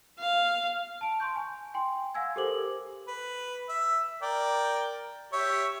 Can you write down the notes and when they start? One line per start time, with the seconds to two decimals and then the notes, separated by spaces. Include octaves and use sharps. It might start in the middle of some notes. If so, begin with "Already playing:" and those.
0.19 F5
1.01 A5 D7
1.20 C6 C#6 G6
1.36 G#5
1.74 G5 G#5 C6
2.14 F5 F#5 G#5 E6 G#6
2.36 G4 A4 A#4 C5 D6 F#7
3.08 B4
3.69 E5
4.22 A#4 D5 G5
5.33 G4 C#5 E5